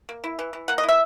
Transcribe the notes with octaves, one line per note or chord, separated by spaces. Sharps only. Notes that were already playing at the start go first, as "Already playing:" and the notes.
A#3
E4
E3
E3
A#3 F#5
D#5
E4
E5